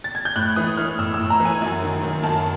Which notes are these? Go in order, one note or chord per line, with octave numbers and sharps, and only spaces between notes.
A6
G#6
G6
A2 F#6
E3 D#6
E3 F6
A2 E6
E6
A2
A#5
E3
G#5
F#2
D#3
D#3
F#2 A5